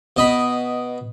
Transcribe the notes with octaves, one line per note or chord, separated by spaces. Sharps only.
B2 D#5 B5